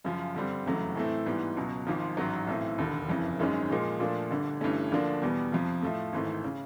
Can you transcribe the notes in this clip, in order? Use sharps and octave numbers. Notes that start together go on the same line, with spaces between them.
F#2 C#3 F3
G2 D3 G3 C4
F1 E2 C#3 F#3 A3
A2 E3 A3 C4
G#2 E3 G3 B3
C#2 B2 F#3
G#1 G#2 F3
A1 G#2 D#3 F#3
B1 A2 E3 A3 C4
E1 D#2 D3
F#1 F2 C#3 E3
G#1 F#2 D#3 G#3 C#4
A#2 F3 G#3
A#2 F3 A3 D4 F4
G1 G2 D3
G1 G2 E3 A3 C#4
D2 D3 F3 A#3 D4
E2 B2 G3 B3
F2 C3 F3
A2 F3 A3
G#1 G#2 E3 A3
C#3